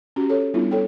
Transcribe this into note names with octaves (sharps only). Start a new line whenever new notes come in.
C#4 F#4 G4
A4 C#5
G3 B3 D4 E4 F4
A4 C#5 G5